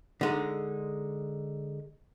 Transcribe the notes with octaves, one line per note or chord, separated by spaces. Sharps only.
D3 G#3 D#4